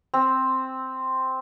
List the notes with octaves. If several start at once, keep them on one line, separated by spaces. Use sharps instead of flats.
C4